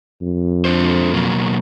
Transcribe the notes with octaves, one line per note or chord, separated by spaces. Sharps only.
F2
D4 A4 C5
B2 F#3 A#3